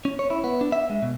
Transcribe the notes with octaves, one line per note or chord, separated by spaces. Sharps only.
C#4
C#5
E4
B3
D4
E5
G#3
B2